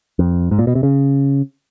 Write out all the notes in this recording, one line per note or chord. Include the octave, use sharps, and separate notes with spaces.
F2
G#2
A#2
B2
C3
C#3